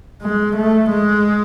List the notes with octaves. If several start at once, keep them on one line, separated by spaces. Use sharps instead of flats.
G#3
A3
G#3